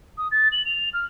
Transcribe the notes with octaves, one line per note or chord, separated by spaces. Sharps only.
D#6
A6
F#7
F7
F6